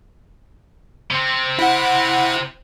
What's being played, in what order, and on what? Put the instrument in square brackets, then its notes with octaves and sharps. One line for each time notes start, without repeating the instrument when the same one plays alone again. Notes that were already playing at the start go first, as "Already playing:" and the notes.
[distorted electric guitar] C3 C4
[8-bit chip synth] E4 F#5